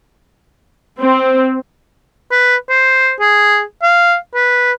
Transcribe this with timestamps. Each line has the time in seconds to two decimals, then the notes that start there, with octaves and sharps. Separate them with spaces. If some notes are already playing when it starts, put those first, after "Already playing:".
0.99 C4
2.31 B4
2.69 C5
3.20 G#4
3.82 F5
4.35 B4